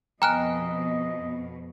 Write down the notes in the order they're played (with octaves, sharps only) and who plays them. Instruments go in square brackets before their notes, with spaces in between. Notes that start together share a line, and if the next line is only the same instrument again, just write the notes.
[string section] F2 B2 [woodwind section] D#5 [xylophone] G5 F6 F#6 [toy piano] G#5 A#5